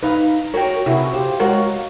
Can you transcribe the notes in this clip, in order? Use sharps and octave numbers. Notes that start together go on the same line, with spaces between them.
D#4 B4 F5
F#4 G#4 A#4 C#5 G5
C3 E4 F#4 G#4
G4 C5 F5
G#3 F#4 A#4 C#5 F5 F#5